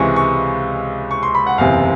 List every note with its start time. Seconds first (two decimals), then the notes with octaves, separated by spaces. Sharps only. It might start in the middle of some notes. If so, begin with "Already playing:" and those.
Already playing: C#2 C3 E3 G#3 C#6
0.16 C#6
1.11 C#6
1.23 C6
1.35 B5
1.47 F#5
1.58 F#1 E2 C3 F5